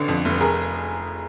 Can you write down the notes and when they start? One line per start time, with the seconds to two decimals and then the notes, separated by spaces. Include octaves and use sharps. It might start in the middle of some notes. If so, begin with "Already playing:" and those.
Already playing: A1 D3
0.08 F2
0.25 F1
0.41 G#4 A#4